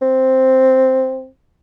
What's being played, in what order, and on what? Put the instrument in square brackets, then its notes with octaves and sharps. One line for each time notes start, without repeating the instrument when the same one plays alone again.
[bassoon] C4